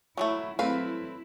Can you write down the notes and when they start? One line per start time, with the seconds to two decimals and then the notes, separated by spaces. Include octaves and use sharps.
0.17 F#3 G#3 A3 E4
0.59 F#3 A3 C4 E4 B4 F5